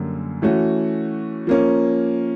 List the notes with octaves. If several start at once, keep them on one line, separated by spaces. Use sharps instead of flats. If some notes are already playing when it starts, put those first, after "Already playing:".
Already playing: F#2 D3 G3 A#3
E3 A3 C#4 F#4
F3 A#3 C#4